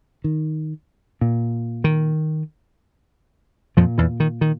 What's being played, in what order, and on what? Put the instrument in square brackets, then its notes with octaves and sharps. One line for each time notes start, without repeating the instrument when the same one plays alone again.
[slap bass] D#3
A#2
D#3
F2 A#2 F3
E2 E3
D#3
D#3